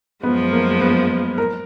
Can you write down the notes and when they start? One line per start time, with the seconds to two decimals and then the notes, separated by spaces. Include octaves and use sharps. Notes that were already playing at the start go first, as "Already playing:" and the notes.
0.23 F#2 F3 G#3 B3
0.52 A#3
0.81 B3
1.38 A#4